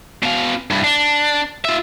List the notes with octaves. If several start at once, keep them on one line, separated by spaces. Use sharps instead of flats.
B2 F5
G2 E4
D4
F4 E5